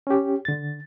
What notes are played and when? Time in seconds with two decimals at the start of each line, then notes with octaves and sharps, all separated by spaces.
0.07 C#4 G4
0.45 D3 A6